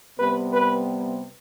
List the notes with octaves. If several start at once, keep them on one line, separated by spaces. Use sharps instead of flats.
C3 G3 B3 B4
B4